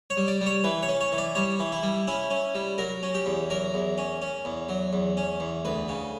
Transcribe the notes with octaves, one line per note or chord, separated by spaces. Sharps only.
C#5
G3
D5
G3
C#5
E3 B4
C#5
C#4
C#5
E3
D5
G3 C#5
E3
E4
G3
C#4 E4
C#4
G3
F#3 A#4
C#4
G4
E2
F#3 A#4
E2
C#4
C#4
E2
F#3
E2
C#4
E2
D2 B4
C#3